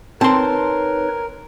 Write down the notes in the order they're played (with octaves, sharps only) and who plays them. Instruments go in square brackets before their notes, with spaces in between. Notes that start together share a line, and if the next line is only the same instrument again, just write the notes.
[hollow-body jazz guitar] C4 C6 [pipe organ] D#4 B4 C#5 [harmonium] A#4 [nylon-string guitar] A5